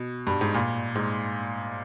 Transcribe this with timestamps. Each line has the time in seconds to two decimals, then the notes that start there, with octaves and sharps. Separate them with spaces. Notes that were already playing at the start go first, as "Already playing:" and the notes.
Already playing: B2
0.27 G2
0.41 G#2
0.54 A#2
0.95 G#2